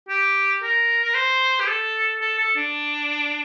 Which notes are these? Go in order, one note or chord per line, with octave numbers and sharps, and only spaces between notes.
G4
A#4
A#4
C5
G4
A4
A4
A4
D4